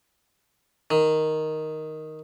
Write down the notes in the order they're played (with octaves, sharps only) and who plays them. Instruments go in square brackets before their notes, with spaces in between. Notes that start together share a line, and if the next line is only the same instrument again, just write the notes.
[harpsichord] D#3